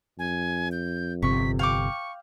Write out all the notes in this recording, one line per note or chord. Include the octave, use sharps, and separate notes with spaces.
F2 G#5
G6
G1 C3 C#6 B6
F5 G5 C#6 D6